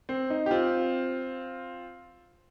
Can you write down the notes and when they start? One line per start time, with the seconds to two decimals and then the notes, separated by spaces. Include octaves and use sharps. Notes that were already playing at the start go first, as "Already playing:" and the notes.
0.09 C4
0.30 D#4
0.46 G4
0.51 C4 F4